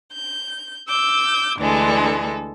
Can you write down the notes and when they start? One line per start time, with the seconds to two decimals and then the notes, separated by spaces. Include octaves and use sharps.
0.11 G6
0.88 D6 E6 G6
1.58 D2 E3 G#3 D4 A4